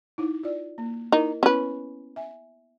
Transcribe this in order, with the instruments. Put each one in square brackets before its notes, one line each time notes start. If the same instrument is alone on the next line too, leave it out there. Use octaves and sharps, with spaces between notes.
[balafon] D#4 E4
F4 D5
A#3
[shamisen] D#4 [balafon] E4 A#4 D#5
[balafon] B3 E4 [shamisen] C#4 B4
[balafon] E5 G#5